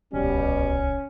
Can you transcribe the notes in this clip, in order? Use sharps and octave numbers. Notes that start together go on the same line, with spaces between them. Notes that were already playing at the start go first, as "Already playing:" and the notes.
D1 C2 B2 G3 C#4